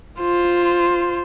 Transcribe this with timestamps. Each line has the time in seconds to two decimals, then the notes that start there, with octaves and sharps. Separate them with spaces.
0.20 F4 C5